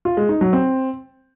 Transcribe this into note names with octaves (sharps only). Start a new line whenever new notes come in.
F4
G#3
D#4
F#3
C4